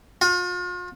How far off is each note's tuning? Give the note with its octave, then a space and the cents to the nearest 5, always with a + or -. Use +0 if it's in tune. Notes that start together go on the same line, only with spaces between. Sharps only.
F4 +40